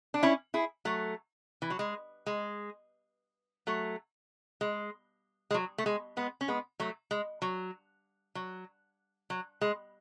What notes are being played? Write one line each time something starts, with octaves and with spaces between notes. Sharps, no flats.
D4
C#4 E4
E4 G#4
F#3 A3
E3
F#3
G#3
G#3
F#3 A3
G#3
G#3
F#3
A3
G#3
G#3 B3
C#4
G#3 B3
F#3 A3
G#3
F#3
F#3
F#3
G#3